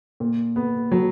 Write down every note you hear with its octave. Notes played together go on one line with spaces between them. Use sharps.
A#2
B3
F#3